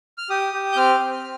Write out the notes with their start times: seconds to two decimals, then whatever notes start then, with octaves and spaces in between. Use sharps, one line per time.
0.18 F6
0.30 G4 D#6
0.53 G4
0.72 G6
0.76 C4 F6
1.00 C4